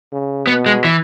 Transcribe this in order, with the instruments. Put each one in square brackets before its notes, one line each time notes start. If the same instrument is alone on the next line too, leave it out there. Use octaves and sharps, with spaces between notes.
[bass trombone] C#3
[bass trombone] B2 [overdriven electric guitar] B3
[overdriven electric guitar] G#3
E3